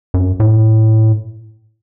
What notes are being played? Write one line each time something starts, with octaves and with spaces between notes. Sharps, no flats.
F#2
A2